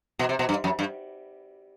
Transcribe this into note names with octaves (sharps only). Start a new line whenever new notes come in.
B2
C3
B2
G2
F#2
G2